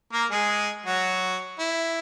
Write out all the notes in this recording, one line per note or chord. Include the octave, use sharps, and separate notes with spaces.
A#3 A#4
G#3 G#4
F#3 F#4
E4